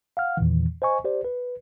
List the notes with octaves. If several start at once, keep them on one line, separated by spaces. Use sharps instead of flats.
F5 F#5 F6
E2 A#2 D#3 E3
C5 D#5 G#5 C#6
G4 C5 D5
B4